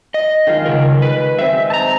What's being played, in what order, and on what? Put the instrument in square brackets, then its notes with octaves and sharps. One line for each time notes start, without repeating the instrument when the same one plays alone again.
[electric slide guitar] D#5
[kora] D#3 G#3 F4
[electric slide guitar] C#3 A#4
B4
[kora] G#3 C4 [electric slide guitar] E5
[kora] D#4 [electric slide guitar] A5 A#5